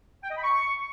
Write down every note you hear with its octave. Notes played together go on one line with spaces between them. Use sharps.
G5
D#5
B5
C#6